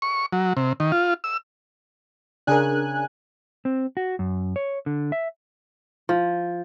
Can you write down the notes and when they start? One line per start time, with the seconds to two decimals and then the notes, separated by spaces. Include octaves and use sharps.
0.02 C#6
0.33 F#3
0.57 C3
0.80 D#3
0.92 F4
1.24 E6
2.47 C#3 D4 G#4 A#4 G#5 F#6
3.65 C4
3.97 F#4
4.19 F#2
4.56 C#5
4.86 D3
5.12 E5
6.09 F3